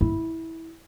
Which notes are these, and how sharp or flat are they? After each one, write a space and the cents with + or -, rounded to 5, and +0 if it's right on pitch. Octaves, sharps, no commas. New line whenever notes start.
E4 -15